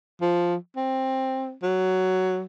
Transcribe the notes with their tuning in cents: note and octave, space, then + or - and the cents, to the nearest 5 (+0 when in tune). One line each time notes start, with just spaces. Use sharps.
F3 +0
C4 +10
F#3 +10